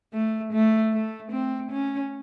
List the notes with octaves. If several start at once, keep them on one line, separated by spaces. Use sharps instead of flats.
A3
A3
A3
C4
C#4